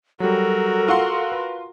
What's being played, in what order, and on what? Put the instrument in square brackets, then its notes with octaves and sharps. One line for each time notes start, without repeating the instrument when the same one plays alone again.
[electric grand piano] F#3 G3 [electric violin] F#4 A#4 [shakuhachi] A4
[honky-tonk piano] F4 C6 [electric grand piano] F#5 C#6 E6
[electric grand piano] B4